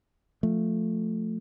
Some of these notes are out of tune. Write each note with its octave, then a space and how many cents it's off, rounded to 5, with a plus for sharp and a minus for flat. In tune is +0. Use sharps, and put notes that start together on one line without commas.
F3 +10 A3 +0